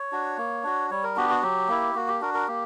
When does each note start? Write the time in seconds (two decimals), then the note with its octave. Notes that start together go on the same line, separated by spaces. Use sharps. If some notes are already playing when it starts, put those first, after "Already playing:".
Already playing: C#5
0.12 D4 F#4
0.38 A#3
0.64 D4 F#4
0.91 G3 C#5
1.04 A#4
1.16 B3 D4 F#4 G4
1.30 F#4
1.42 F#3 G4
1.68 A#3 E4
1.95 A#3 F#4
2.08 G4
2.21 D4 F#4 A#4
2.34 A#4
2.48 A#3 G4